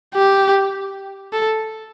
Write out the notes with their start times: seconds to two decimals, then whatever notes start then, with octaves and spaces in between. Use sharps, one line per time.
0.15 G4
1.33 A4